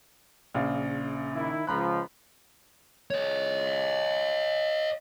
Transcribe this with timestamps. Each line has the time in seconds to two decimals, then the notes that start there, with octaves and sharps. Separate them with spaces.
0.54 A#1 C#3 F5
1.35 D#3 E4
1.67 C#2 F3 A#5 B5 F#6
3.10 C#5 D#5